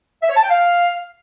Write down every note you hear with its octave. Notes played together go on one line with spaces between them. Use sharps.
E5
C#5
A5
G5
F5